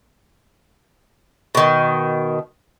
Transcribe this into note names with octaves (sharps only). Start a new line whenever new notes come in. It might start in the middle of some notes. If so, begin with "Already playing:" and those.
B2 D#3